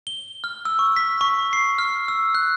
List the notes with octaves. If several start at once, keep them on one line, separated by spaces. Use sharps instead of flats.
G7
F6
E6
C#6
B6
C#6
C7
F6
E6
F#6